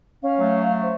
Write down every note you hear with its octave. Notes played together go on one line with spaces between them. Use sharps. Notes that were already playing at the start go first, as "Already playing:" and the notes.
C#4 F5
F#3 A3
C5